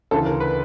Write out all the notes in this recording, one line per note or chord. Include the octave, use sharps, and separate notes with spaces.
D2 C#3 E3 A4
A#4
B4